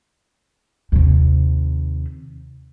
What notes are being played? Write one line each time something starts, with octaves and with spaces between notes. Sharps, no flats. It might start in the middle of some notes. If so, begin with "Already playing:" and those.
D#2 C3